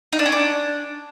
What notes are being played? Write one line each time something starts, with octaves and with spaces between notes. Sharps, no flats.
D#4
D4
C#4
D4